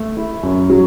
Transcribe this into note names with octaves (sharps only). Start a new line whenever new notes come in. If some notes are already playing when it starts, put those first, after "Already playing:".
Already playing: A3
E4
F#2
F#3